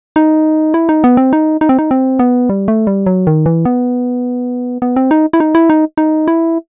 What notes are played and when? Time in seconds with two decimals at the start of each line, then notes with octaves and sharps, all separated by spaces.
0.16 D#4
0.74 E4
0.89 D#4
1.04 B3
1.17 C4
1.33 D#4
1.61 D#4
1.69 C4
1.79 D#4
1.91 C4
2.19 B3
2.49 G3
2.68 A3
2.87 G3
3.06 F#3
3.27 D#3
3.46 E3
3.65 B3
4.82 B3
4.96 C4
5.11 D#4
5.33 E4
5.40 D#4
5.55 E4
5.70 D#4
5.97 D#4
6.28 E4